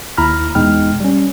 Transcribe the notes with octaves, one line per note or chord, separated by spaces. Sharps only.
D#2 E4 A#5 B5 F6
E2 B2 G#3 D#4 G5 F6
G3 C#4